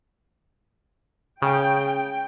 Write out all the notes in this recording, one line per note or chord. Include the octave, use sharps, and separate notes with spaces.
C#3 G5